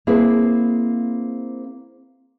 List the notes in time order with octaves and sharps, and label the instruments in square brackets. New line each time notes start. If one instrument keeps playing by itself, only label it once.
[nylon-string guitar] A#3 C4 E4 G#4 B4